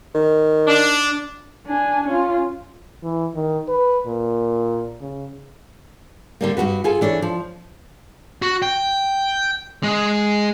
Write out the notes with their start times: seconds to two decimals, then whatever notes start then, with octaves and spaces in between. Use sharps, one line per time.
0.14 D#3
0.67 D4
1.66 D4 G#5
2.08 C#4 F4
3.03 E3
3.35 D#3
3.68 B4
4.06 A#2
5.01 C#3
6.41 D3 G3 A#3
6.57 G2 A#2 F#4 B4
6.84 F4 G#4 A4
7.01 E3 D4 A4 C#5
7.22 F3
8.42 F#4
8.62 G5
9.83 G#3